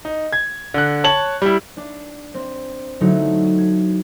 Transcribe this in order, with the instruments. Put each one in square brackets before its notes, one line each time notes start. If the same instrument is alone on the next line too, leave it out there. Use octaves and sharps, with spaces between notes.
[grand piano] D#4
G#6
D3 F#6
C#5 A5 F#7
G3 E4
[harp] D4
C4
D3 F#3 A3 D#4 E4
G#6